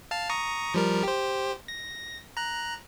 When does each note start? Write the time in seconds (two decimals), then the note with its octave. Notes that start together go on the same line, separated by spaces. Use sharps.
0.11 F5 A5 F6
0.30 A#5 C#6 D#6
0.74 F3 G3 A#4
1.03 G4 C5
1.68 A#6
2.37 A#5 F#6